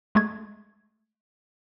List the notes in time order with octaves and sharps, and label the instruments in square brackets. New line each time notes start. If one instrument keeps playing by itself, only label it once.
[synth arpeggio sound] G#3 A3 G#6